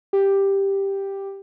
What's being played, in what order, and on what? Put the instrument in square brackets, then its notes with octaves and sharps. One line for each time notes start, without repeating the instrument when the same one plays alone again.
[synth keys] G4